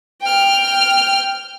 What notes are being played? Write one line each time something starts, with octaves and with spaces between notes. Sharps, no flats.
G5 F6